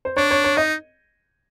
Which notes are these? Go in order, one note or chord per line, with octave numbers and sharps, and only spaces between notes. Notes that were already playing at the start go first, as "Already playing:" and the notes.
C5
D4 C#5
C#5
C#5
D#4 D#5